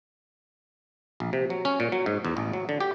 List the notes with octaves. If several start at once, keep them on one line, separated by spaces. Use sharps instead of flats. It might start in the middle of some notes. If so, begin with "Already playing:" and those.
A#1
C3
F#3
C#4
A#2
F#3
G#2
E2
A1
F#3
D3
G4